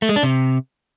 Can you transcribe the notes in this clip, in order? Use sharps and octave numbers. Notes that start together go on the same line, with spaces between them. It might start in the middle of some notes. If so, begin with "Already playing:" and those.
A3
G#3
D4
C3